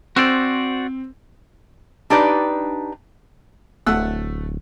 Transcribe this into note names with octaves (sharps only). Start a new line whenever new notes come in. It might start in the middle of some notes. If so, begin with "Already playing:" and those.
C4 F#4 C5 D5 E6 E7
D4 D#4 G4 B4 D5
D1 A3 F#5 E6